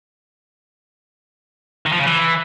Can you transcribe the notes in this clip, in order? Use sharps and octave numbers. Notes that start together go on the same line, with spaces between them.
D#3
F3
C#3
E3